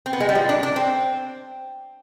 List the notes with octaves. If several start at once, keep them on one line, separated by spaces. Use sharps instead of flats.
C4
B3
G#3
G3
F3
D4
D4
C4